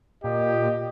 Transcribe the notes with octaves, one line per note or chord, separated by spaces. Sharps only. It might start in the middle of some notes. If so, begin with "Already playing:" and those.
A#2 G4 D#5